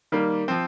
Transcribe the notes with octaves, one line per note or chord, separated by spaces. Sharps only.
D#3 G3 A#3
F3 C4